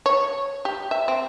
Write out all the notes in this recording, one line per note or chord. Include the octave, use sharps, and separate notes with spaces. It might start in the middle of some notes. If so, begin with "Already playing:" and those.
C#5
G4
E5
C4